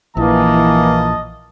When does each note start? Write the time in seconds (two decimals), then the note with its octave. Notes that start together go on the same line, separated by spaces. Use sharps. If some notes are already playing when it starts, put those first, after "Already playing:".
0.17 A#1 E3 A#3 D#5 A5